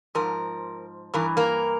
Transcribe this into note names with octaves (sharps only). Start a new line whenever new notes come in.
G#2 F3 A#4
G2 E3 A#4
A#3 A#4